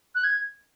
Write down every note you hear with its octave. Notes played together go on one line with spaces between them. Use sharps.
F#6
G#6